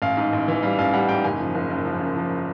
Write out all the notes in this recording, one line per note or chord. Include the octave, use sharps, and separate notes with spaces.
A1 F5
G#2
A1
E3
G3 F5
A1 F5
G3 F#5
G#2 G5
F#1 G#5
F3
F#1
F#2
F3
F#2
F3